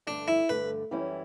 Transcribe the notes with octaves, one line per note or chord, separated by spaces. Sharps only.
G2 D3 A3 D4
E4
G2 D3 A3 B4
F#2 E3 G3 C#4 E4